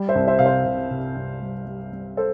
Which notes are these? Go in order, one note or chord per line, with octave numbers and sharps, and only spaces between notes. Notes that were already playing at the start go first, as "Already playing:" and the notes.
Already playing: G3
C5 E5
C2
C5 E5
C3 F5
C5 E5
C3
C3
C2
G3
G3
G3
A4 C5